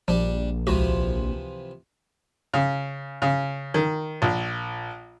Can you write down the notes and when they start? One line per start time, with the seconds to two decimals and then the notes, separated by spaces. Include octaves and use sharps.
0.08 A#1 F3 G3 D4
0.67 C#2 C3 E3 F3 F#4
2.54 C#3
3.22 C#3
3.74 D#3
4.22 A#1